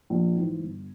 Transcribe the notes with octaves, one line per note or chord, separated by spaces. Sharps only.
A#1
G#2 E3
G1